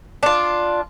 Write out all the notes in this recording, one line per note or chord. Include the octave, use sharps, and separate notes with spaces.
D4 F4